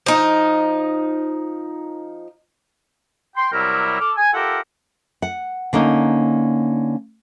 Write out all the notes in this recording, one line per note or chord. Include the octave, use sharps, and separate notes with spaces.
F3 D#4
G5 C6
C3 F#3 G3 E4 A#4
A4 D6 F6
G#5
F4 G4 A4 A#4 E5 F#5
F#5
D3 A#3 C#4 D#4